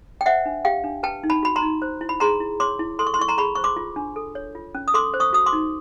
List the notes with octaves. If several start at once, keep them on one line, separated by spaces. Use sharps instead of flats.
G5
C5 E5 F#5
D4
G4 F5 G5
D4
B4 G5 A5
D#4
A5 B5
F#4 B5
A#5 C6
D#4
C5
E4
B5
G#4 A#5 C6
E4
C#5 C6 D6
E4
A4 C6
C#6
C6
E4 C#6
A#5 C6
G#4 B5 C#6
C5 C#6
C6 D6
F4
D4
A4
C#5
F4
C#4
D#6
A4 C6 D6
C5
C#6 D#6
F#4 D#6
C6 D6
D#4